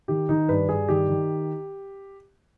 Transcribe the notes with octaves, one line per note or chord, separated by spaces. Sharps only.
D#3 G4
D#3 D#4
G2 B4
G2 G#4
D#3 G4
D#3